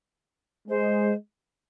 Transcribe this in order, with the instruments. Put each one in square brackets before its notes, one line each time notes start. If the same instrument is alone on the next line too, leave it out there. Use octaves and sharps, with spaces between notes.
[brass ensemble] G#3 [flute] C5